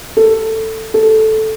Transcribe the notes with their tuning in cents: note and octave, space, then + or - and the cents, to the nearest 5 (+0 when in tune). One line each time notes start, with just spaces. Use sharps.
A4 +10
A4 -10